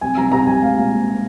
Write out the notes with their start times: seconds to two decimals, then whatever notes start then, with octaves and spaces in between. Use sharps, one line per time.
0.01 C2 G#5
0.17 C2 A#5
0.32 C2 A#5
0.46 C2 G#5
0.62 G#3 F5
0.77 A#2
0.92 A#2